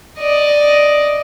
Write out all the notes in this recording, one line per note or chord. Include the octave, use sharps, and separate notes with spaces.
D5 D#5